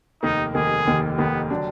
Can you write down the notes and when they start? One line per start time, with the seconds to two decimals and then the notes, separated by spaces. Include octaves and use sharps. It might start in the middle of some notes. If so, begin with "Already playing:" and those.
0.23 F1 D#2 D#3 A#3 D#4
0.54 F1 D#2 D#3 A#3 G#4
0.86 F1 D#2 D#3 A#3
1.18 F1 D#2 D#3 A#3 B3
1.50 D3 F#3 D4